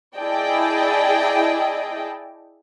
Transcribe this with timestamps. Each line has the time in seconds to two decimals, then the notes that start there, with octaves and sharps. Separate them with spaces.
0.17 E4 G#4 D5 D#5 G5 A5